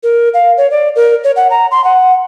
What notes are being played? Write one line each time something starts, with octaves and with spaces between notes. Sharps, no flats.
A#4
F5
C#5
D5
A#4
C#5
F#5
A#5
C6
F#5